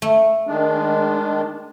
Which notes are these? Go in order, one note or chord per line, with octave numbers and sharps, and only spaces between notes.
A3
D#3 G#3 D4